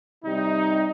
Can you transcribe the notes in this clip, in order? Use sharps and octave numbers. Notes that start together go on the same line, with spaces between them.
C3 G3 D#4